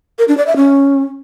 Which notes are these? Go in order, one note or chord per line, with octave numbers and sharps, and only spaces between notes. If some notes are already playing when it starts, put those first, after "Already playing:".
A#4
D4
D5
E5
C#4